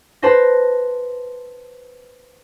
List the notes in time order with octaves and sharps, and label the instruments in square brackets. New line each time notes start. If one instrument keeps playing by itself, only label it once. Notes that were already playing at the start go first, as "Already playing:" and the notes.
[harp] B4 C5 A5 C6 A#6